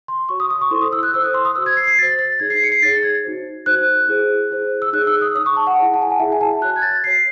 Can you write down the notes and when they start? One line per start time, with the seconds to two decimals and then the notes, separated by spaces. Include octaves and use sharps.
0.08 C6
0.29 F#4 C#5 C#6
0.40 D#6
0.50 D#6
0.61 C#6
0.71 E4 A4 C5 C6
0.82 D#6
0.93 E6
1.03 F#6
1.14 E4 A4 C5 E6
1.24 D#6
1.34 C6
1.45 D#6
1.55 F#4 C5 E6
1.66 G#6
1.77 C7
1.87 C7
1.98 F#4 C5 A6
2.19 A6
2.40 D#4 G#4 C#5 G#6
2.50 C7
2.64 C#7
2.72 C7
2.82 D#4 G#4 C#5 A6
3.03 G#6
3.24 D#4 F#4 C5
3.66 D#4 F#4 C5 F#6
4.08 E4 G#4 C5
4.51 E4 G#4 C5
4.82 E6
4.93 D#4 G#4 C#5 F#6
5.07 E6
5.21 D#6
5.35 D#4 G#4 C#5 D#6
5.46 C#6
5.57 A5
5.67 F#5
5.78 E4 G#4 C#5
5.94 A5
6.02 G#5
6.11 F#5
6.20 E4 G#4 C#5 E5
6.32 G#5
6.41 A5
6.61 F#4 C#5 F#6
6.76 G#6
6.82 A6
7.03 F#4 C#5 C7